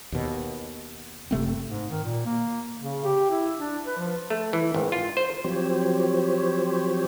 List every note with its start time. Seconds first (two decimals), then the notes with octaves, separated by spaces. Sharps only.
0.12 D#2 B2
1.31 F#1 C3 A3 C4
1.70 G#2
1.90 D#3
2.04 A#2
2.25 A#3
2.81 C#3
3.04 G4
3.31 E4
3.58 D4
3.86 B4
3.99 F3
4.30 A3
4.53 E3
4.74 G#1
4.92 F4
5.17 C5
5.44 F3 F#3 C4 G4 C5 C#5